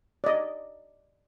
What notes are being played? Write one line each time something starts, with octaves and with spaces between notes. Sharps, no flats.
D5 D#5